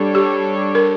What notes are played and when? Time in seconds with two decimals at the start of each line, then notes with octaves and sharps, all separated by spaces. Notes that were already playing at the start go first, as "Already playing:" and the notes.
Already playing: G3 D4 A4 C#5
0.15 G4
0.75 A#4